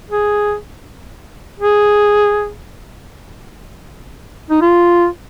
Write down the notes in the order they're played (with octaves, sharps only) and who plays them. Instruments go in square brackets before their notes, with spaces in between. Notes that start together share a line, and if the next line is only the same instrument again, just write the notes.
[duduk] G#4
G#4
D#4
F4